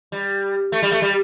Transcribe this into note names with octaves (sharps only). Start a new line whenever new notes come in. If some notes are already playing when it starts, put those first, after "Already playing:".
G3
A3
G3
A3
G3